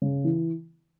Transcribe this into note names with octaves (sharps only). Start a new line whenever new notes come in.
C#3
E3